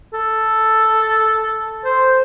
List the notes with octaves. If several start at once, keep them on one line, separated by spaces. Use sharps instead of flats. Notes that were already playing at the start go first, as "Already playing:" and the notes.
A4
C5